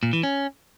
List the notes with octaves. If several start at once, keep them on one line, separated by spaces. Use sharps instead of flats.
A#2
E3
C#4